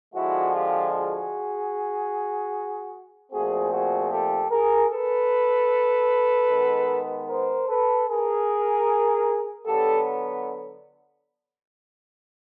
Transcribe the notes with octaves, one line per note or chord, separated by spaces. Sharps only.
D3 F3 G#3 E4 F#4
F4 G4
F#4 G#4
A#2 F3 A3 C4 F#4 G#4
F#4 G#4
G4 A4
G#4 A#4
A4 B4
D#3 G#3 B3
A#4 C5
A4 B4
G#4 A#4
D3 F#3 B3 G4 A4